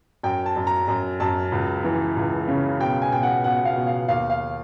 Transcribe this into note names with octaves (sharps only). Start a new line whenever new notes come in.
F#2 G5
A5
F#2
A#5
F#2
F#2 A5
C#2
E3
C#2
C#3
B2 G5
G#5
B2 G5
F#5
B2 F#5
F5
B2
F5
D#2 F5
F5